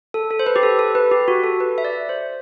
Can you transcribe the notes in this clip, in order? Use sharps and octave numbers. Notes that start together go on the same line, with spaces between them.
A4
A4
C5
B4
G4
A4
A4
B4
G4
F#4
A4
B4
E5
D5
C5